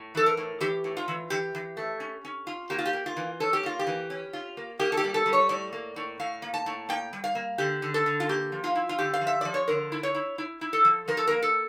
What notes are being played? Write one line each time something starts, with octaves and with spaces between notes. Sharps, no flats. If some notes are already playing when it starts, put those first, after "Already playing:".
Already playing: A2
E3 A4
A#4
A2
E3 G4
A2
F4
E3
E3 G4
E3
A3
C#4
C#4
F4
A#3 G4
F4
G4
A#3
F4
E3
C#4 A4
G4
A#3 F4
G4
E3
C#4
F4
A#3
A#3 G4
A4
G4
G3
A4
G3
C#5
A2 D5
A#3
A2
A2 F5
A#3
A5
A2
A#3 G5
G3
F5
A#3
D3 G4
D3
A4
D3
F4
A#3 G4
F3
F4
E4
F4
D3 G4
F5
F3
E5
F3 D5
C#5
D3 A#4
E4
C#5
E4
E4
E4
A4
F3
F3 A#4
A4
A#3 A#4
A4